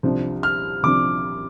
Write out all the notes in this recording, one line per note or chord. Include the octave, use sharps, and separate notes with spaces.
C2 C3 F3 D4
F6
C2 C3 F3 D4 D6